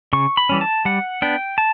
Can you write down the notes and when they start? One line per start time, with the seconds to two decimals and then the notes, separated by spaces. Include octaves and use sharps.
0.13 C#3 C#6
0.37 B5
0.49 E3 G3 C#4
0.61 A5
0.85 G3 F#5
1.22 B3 D4 G5
1.58 A5